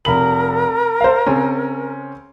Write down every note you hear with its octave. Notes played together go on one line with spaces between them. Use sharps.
F1 A#4 B5 F#7
C5 F5
C#3 C4 C#4